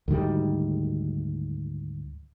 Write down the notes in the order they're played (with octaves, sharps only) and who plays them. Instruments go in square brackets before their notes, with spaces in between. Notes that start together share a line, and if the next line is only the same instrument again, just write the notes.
[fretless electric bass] D2 G#2 D#3 G3